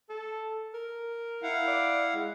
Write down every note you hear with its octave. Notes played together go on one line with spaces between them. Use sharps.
A4
A#4
E4 F5 F#5
D5
G#3